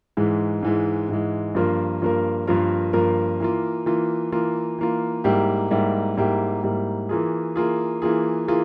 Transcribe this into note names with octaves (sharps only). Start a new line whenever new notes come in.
G#2 E3 G#3
G#2 E3 G#3
G#2 E3 G#3
G2 F3 A#3 F4 A#4
G2 F3 A#3 F4 A#4
G2 F3 A#3 F4 A#4
G2 F3 A#3 F4 A#4
E3 A#3 F4
E3 A#3 F4
E3 A#3 F4
E3 A#3 F4
G#2 G3 A#3 E4 G4
G#2 G3 A#3 E4 G4
G#2 G3 A#3 E4 G4
G#2 G3 A#3 E4 G4
E3 A#3 F4 G#4
E3 A#3 F4 G#4
E3 A#3 F4 G#4
E3 A#3 F4 G#4